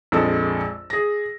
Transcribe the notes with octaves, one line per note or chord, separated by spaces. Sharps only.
A#1 F2 G#3 A4 D#5 E6
G#4 A#6